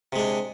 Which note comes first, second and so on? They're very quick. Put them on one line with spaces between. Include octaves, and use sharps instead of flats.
C3 G#3 D4